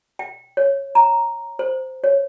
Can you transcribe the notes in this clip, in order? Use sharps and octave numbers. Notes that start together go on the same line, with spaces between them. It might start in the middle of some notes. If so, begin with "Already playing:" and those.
G5
C#5
A#5
C5
C#5